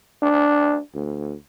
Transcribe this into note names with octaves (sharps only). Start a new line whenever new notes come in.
D4
D2